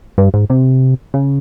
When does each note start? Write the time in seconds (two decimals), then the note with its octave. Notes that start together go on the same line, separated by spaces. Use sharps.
0.18 G2
0.34 G#2
0.50 C3
1.14 C#3